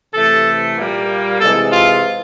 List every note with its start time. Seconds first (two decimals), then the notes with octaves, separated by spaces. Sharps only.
0.13 C3 E3 A3 A4
0.76 A#2 G3 A#3
1.40 C3 E3 G#3 A4
1.72 F4